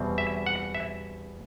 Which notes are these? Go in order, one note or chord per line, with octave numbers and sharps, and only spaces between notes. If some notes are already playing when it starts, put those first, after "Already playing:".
Already playing: E2 B2 G3 C4
E5
F#5
E5